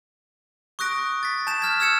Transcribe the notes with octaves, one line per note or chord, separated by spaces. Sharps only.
C#6 D#6 F#6 A#6 D7
A6 B6
A5 G6 B6 E7
F6 G#6
E6 F6 G#6 C#7 E7